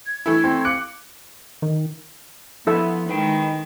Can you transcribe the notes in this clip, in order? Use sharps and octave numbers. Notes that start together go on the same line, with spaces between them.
G#6
E3 A3 E4
C4
F5 D6 F#6 C#7
D#3
F3 B3 E4 A4 E5
D#3 G#3 B4 G5